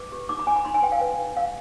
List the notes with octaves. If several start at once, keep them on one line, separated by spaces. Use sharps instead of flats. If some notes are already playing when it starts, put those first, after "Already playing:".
Already playing: B4 D6
G4
D#4 D6
B5
D#4 G#5
B5
D#4 C6
G#5
B4 G5
F5
B4
D#4
D#4 F5